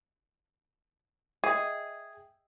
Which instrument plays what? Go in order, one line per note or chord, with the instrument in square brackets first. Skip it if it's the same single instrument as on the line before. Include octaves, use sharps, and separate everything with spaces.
[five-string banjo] G#4 [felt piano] D#5 E5 G5